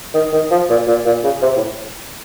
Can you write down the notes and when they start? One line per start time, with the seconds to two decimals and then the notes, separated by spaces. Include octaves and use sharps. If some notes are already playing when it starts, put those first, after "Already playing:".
0.14 D#3
0.33 D#3
0.51 F3
0.69 A#2
0.87 A#2
1.05 A#2
1.23 C#3
1.42 C3
1.56 A2